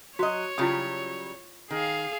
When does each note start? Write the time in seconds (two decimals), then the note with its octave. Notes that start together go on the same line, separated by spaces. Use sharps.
0.19 F#3 F#4 C#5 D#5
0.58 C#3 F#3 G3 E4 F4 D#6
1.71 D#3 G#4 F5